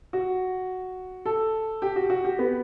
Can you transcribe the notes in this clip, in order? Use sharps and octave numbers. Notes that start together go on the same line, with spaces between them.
F#4
A4
G4
F#4
F#4
G4
B3